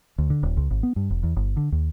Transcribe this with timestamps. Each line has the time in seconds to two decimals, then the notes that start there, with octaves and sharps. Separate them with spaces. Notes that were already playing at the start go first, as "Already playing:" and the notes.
0.18 D2
0.30 D3
0.43 D#1
0.57 C#2
0.71 G#1
0.83 B3
0.96 G2
1.10 E1
1.23 E2
1.37 G1
1.57 D3
1.72 D#2